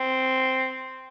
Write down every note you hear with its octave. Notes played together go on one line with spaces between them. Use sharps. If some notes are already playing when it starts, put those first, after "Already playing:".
Already playing: C4